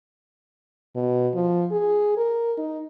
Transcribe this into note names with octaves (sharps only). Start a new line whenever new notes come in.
B2
F3
G#4
A#4
D#4